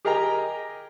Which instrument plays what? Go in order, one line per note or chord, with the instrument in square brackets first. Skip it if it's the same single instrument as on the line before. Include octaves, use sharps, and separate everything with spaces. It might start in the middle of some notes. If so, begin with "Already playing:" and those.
[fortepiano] G4 G#4 A#4 D#5 G5 A#5